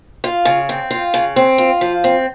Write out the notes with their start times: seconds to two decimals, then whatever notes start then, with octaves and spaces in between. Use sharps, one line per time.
0.24 F4
0.45 C#3
0.69 C4
0.91 F4
1.14 C#3
1.36 C4
1.58 F4
1.81 F3
2.04 C4